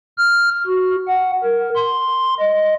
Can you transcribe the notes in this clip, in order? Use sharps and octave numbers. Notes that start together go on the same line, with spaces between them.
F6
F#4
F#5
A#4
C6
D#5